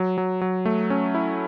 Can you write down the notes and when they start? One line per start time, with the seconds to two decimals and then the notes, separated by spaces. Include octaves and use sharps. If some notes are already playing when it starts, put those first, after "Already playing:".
Already playing: F#3
0.18 F#3
0.41 F#3
0.65 A3
0.90 C#4
1.15 E4